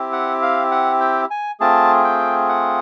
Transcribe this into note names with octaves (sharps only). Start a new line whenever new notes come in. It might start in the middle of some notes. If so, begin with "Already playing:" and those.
Already playing: C4 E4 G4
F#5
F5
F#5
G5
G#5
A3 C4 F4 G#4 A5
G5
F#5